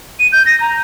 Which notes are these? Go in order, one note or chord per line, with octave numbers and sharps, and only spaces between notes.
D#7
G6
A#6
A#5